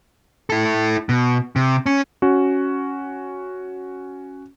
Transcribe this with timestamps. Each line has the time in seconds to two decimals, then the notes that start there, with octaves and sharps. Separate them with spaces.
0.50 E4 A4
1.09 B2
1.56 C3
1.86 C#4
2.22 C#4 F#4